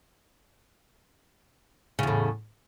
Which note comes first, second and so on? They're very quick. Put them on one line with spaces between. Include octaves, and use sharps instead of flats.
C#3 E2 A2